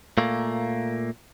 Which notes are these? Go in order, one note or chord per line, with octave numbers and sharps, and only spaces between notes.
A#2 A3 A#3